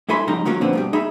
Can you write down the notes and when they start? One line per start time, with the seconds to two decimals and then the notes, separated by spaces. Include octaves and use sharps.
0.09 G2 E4 A4 G#5 B5 C6
0.27 F2 G#2 C#3 G3 D#4 A#5
0.45 D#3 F#3 A#3 C#4 F4
0.61 A#2 D3 F3 B3 C4
0.73 G2 B2 G3
0.93 D#4 G#4 E5 B5